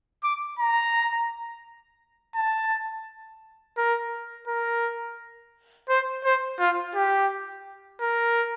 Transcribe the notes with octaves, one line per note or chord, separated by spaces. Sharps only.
D6
A#5
A5
A#4
A#4
C5
C5
F4
G4
A#4